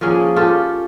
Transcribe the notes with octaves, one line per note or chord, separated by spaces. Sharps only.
F3 A#3 C#4 G#4
C#4 F4 G4 A4